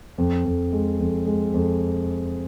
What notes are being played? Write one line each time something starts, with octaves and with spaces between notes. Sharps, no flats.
F2
F2
G#3
F2
G#3
F2